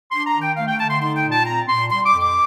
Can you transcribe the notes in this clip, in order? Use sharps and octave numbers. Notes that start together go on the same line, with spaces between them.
D4 C6
A#5
D#3
G5
A3 F5
G5
D3 A5
C6
D#4 C6
G5
A#2
A5
C4 A#5
A#2 C6
G3 C6
D6
F2
D6